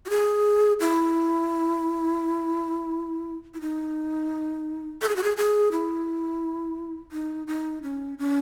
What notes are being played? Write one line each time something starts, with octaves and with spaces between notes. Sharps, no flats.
F#4
G#4
E4
E4
D#4
A4
G#4
F#4
G#4
G#4
E4
D#4
D#4
C#4
C#4